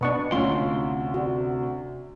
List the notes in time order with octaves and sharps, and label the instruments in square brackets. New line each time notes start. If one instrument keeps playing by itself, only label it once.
[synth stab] B2 B3 D4 [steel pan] D#5 C#6
[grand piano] D2 [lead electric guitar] C3 C6 [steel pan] C#4 F4
[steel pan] F#4 D5